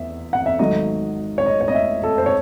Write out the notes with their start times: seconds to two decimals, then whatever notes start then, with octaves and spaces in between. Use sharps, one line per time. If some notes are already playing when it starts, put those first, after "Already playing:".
Already playing: E2 E5
0.33 F#5
0.46 E5
0.59 G#1 G#2 F#3 A3 D#5
1.38 C#5
1.46 D#5
1.61 C#5
1.68 D#5
1.75 E5
2.04 A4
2.18 C5
2.26 C#5